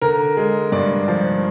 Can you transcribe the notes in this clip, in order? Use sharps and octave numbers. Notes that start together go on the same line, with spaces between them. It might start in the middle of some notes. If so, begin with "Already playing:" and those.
D3 A#4
G#3
G2 D5
F3